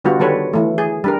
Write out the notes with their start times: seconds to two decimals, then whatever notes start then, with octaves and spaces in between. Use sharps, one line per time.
0.04 D3 G3 B3 F4 F#4
0.20 D#3 G3 A4 B4 C#5
0.54 E3 A3
0.78 G#4
1.04 G3 D4 A#4